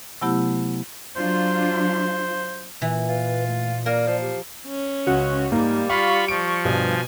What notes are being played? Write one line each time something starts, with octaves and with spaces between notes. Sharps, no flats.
C3 F#3 A3 B3 E4 G4
F#3 D4 F4 C5
A#2 E3
F4 B4
A3
A#3 A#4 D5
F3
G4
C#4
C#2 F#4
G#2 G3 A#3
F4 F5 B5 C#6
F3 D7
G2 B2 G#5